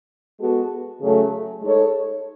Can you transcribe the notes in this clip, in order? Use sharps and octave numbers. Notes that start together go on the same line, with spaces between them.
G#3 B3 F#4 A4
C#3 F#3 A3
G#3 D#4 A4 C#5